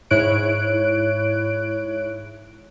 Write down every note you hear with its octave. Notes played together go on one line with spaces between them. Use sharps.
G#2 E4 C#5 F#6 D7